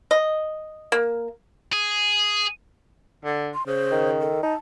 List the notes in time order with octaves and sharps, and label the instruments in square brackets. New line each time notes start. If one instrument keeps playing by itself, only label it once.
[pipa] D#5
A#3
[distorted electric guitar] G#4
[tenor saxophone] D3
[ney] C6
[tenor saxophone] C#3 [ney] C5
[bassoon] D#3
[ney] A4
[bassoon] D#4 [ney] A5